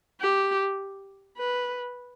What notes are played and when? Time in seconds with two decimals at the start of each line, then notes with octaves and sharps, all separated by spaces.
0.21 G4
1.38 B4